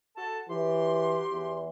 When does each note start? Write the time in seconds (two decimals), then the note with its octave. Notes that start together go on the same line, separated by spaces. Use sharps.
0.17 F#4 A4 A5
0.49 E3 F#3 G4 C6
1.31 E2